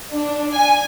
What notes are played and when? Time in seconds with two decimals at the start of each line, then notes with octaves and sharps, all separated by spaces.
0.12 D4
0.54 G#5